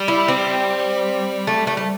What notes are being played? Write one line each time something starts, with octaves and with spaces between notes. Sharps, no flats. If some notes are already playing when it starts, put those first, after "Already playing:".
Already playing: G3
E4
C4
A3
A3
A3